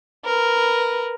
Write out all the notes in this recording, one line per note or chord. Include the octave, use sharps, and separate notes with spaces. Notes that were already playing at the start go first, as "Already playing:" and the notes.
A#4 B4